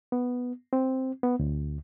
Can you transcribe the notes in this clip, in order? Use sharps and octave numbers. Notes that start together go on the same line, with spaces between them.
B3
C4
B3
D2